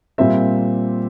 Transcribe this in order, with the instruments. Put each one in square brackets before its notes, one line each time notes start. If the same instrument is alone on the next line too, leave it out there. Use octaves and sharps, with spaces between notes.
[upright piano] A#2 G3 C4 E5